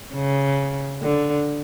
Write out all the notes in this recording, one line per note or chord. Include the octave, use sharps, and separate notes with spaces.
C#3
D3